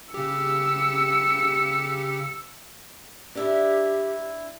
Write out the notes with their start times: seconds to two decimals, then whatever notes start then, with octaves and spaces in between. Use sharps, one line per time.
0.14 C#3 G4 E6 C#7
3.35 D4 E4 G4